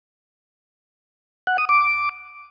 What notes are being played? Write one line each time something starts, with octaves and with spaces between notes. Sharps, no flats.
F#5
D#6
D6